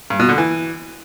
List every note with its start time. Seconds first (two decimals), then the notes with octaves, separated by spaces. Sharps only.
0.10 G2
0.20 B2
0.29 D3
0.38 E3